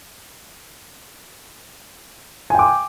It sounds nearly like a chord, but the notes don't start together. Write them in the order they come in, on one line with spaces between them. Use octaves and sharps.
G#5 G5 D6